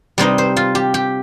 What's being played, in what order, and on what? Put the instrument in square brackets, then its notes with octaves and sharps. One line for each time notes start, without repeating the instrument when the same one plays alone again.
[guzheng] C3 G3 C4 D#4 D#5
C5
F4
G4
G4